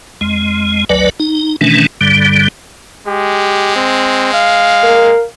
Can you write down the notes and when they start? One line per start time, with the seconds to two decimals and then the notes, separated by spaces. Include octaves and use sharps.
0.21 F2 G#3
0.90 G#1 D2 F#3 B4 D5
1.20 D#4
1.61 B2 D#3 E3 A3 C#4 D4
2.01 G2 D3 G3
3.07 G#3 G4
3.76 C4
4.34 F5
4.83 A#4